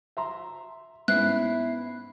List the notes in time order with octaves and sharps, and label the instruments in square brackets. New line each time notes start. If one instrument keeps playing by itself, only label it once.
[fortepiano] E5 A#5 C6
[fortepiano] G#2 C#4 [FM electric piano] B3 C7 [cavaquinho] E4 [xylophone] F#6